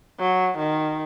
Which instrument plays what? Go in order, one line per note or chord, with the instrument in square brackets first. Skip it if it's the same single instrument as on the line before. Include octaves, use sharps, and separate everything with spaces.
[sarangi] F#3
D#3